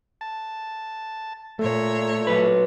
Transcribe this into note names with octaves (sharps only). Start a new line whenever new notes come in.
A5
A#2 A3 C#5
F#3 B4